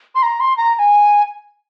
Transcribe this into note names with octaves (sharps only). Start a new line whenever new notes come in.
C6
A#5
C6
A#5
A#5
G#5